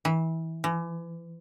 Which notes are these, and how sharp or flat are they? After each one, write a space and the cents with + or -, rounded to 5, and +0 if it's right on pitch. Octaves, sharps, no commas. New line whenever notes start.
E3 -25
E3 +35